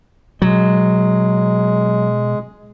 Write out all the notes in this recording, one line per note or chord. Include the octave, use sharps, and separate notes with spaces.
B2 F#3 G#3